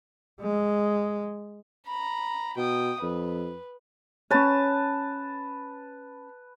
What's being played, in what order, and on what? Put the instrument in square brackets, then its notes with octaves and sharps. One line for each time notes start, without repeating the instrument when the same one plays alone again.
[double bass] G#3
[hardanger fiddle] A#5 B5
[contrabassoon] B2 [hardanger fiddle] G5 D#6
[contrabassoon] F2 [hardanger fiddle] B4
[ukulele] C#4 C#5 [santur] B4 A5